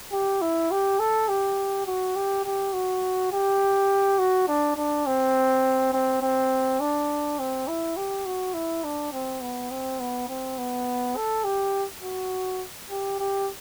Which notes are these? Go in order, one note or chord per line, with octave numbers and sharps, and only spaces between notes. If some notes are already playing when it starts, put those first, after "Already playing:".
G4
E4
G4
A4
G4
F#4
G4
G4
F#4
G4
F#4
D4
D4
C4
C4
C4
D4
C4
E4
G4
F#4
E4
D4
C4
B3
C4
B3
C4
B3
A4
G4
F#4
G4
G4